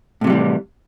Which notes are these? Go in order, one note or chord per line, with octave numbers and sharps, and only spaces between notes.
A2 C3 E3 F#3 G3